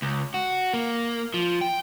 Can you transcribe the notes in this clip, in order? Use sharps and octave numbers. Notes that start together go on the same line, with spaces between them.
C#2
F#4
A#3
F3
G5